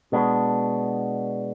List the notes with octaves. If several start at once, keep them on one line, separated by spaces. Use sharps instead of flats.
B2 G#3 B3 D4